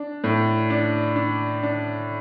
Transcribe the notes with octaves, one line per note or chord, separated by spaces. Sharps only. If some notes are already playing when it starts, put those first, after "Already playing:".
Already playing: D4
A2
D4
D4
D4